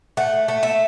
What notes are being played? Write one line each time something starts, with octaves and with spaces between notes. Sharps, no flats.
A3 F#5
A3
E5